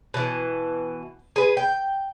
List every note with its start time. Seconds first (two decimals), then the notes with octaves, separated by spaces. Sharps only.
0.14 B2 E3
1.36 G#4 B4
1.57 G5